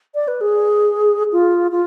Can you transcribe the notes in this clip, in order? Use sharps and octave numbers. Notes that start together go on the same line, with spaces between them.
D5
B4
G#4
F4
F4